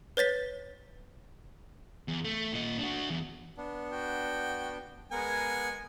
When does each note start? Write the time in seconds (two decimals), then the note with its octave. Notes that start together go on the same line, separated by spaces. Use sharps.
0.17 B4 C#5 A6 B6
2.08 E2
2.25 A3
2.53 A#2 D#5
2.79 D4 F#4
3.10 E2
3.57 B3 D4
3.92 F#4 G5
5.12 G#3 B3 A#4 F#5 G#5